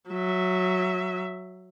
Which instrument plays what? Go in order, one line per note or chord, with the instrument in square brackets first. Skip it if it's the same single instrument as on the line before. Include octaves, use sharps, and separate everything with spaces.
[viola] F#3 E5